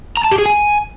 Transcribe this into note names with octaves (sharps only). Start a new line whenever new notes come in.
A#5
A5
G4
G#4
G#5